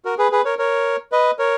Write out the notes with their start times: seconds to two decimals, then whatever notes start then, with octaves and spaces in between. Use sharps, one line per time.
0.05 F#4 A#4
0.18 G#4 B4
0.31 G#4 B4
0.45 A#4 C#5
0.59 A#4 C#5
1.12 B4 D#5
1.39 A#4 C#5